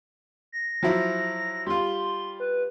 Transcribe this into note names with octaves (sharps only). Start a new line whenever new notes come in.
A#6
F3 F#3 E4
G3 F4 C6
B4